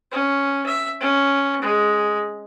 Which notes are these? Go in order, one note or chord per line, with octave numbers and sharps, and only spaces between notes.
C#4
E5
C#4
G#3